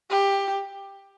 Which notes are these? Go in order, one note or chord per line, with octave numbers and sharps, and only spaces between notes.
G4